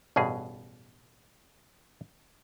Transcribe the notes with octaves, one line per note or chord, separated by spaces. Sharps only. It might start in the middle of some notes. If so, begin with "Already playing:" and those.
A1 G2 B2 G#4